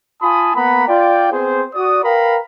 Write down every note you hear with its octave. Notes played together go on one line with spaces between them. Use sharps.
F4 G#5 A5 B5 D#6
A#3 B3 F#5 A#5 B5
F4 D5 G5
B3 C4 G#4 C5
F#4 D5 D#6
A#4 B4 F5 G5 A#5 B5